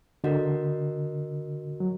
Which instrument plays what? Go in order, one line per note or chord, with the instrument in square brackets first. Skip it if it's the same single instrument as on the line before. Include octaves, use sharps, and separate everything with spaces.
[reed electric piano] D3 [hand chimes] F#4 A#4 D#5 F#5
[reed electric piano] F#3